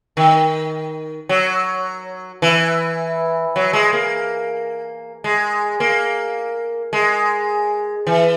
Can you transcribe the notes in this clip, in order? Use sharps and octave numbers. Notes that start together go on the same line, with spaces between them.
D#3
F#3
E3
F#3
G#3
A#3
G#3
A#3
G#3
E3